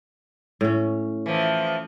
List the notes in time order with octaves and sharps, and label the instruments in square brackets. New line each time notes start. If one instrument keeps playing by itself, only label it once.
[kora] A2 C#4
[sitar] E3 F3